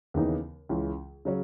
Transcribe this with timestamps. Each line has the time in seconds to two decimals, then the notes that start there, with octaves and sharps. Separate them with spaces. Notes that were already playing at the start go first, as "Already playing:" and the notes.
0.14 D#2 C#3 E3 B3 D#4
0.69 C#2 C#3 E3
1.25 C#3 F#3 C#4